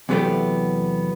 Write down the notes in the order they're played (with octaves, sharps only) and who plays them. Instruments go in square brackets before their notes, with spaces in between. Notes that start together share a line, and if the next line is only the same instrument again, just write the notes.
[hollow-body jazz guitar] E2 C3 F#3 A3 B3 G4